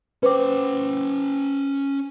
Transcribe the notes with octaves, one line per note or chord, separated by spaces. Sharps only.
C#4 B4 C5 G5 D6